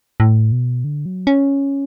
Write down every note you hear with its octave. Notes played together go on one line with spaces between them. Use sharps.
A2
B2
D3
F#3
C#4